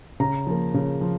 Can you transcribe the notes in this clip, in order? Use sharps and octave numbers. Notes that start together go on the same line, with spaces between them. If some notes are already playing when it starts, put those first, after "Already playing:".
C#3 A#5
F3 A#3
C#3
F3